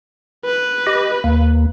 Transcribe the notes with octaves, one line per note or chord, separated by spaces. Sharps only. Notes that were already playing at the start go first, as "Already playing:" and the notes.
B4
G4 D#5
D#2 A#3